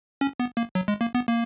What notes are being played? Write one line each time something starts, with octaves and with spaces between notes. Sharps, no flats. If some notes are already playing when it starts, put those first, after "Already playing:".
C#4
B3
A#3
F#3
G#3
A#3
B3
A#3